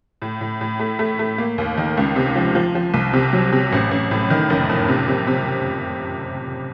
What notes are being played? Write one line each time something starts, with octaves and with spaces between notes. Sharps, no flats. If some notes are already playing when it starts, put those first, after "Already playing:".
A2
A2
A2
A3
A3
A3
A#3
D#2
D#3
C#2
C3
F3
F3
F3
C2
C3
F#3
C3
A1
A1
A2
D#3
F#1
F2
C3
C3
C3